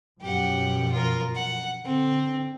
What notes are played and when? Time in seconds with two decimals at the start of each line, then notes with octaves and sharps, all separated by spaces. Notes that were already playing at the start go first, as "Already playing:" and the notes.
0.21 F#2 B2 F3 G4 F#5
0.91 F4 A#4
1.35 F#5
1.84 D3 C4